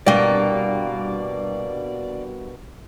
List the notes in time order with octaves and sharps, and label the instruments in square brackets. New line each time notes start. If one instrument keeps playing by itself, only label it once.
[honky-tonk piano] C2 G2 G5 [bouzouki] B2 A#3 [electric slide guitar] D5